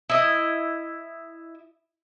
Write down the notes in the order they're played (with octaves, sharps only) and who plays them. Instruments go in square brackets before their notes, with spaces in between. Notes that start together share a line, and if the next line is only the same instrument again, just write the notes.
[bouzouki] E4 D#5